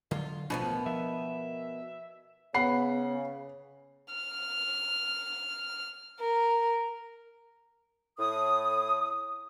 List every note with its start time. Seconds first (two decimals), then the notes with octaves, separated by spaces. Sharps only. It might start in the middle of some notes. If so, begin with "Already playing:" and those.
0.11 D3 F#3 F4
0.50 D#1 A1 B2 D#3 F3 B3 D4
0.86 F3 E5
2.54 C#3 B3 F#5 B5 C7
4.14 F6
6.20 A#4
8.18 A2 D#6